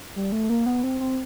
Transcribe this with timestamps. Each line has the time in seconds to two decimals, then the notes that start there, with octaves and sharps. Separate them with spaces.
0.16 G3
0.32 A3
0.50 A#3
0.66 B3
0.83 C4
1.00 C4